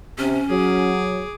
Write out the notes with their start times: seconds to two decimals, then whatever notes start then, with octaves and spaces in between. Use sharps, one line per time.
0.18 C3 C#4
0.49 F#3 G#4 D6